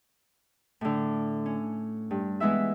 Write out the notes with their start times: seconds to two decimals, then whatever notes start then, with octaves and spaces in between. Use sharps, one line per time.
0.81 A2 D3
1.46 C#4
2.11 G2
2.40 E3 G#3 B3 E4 E5